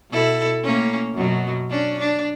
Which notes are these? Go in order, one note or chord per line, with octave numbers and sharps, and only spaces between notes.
B2 E4 A4
A2 A#3 C#4
F#2 B2 F#3
C#4 D4
D4